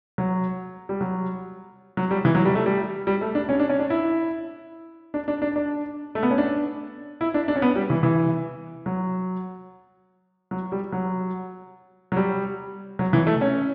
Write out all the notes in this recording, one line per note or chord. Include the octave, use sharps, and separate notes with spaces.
F#3
G3
F#3
F#3
G3
E3
F#3
G3
A3
G3
G3
A3
D4
C#4
D4
C#4
D4
E4
D4
D4
D4
D4
A3
B3
C#4
D4
E4
D4
D4
C#4
B3
G3
E3
E3
F#3
F#3
G3
F#3
F#3
G3
F#3
E3
A3
C#4